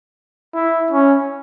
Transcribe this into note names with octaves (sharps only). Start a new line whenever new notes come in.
E4
C#4